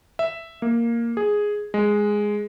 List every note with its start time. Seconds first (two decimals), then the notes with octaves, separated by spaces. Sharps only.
0.19 E5
0.62 A#3
1.17 G#4
1.74 G#3